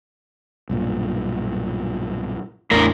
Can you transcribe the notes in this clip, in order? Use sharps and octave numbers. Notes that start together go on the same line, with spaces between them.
B1 G2 A#2
A1 E2 A2 D4 A#4